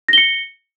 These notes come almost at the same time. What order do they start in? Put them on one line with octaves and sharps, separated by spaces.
A#6 G7 C#7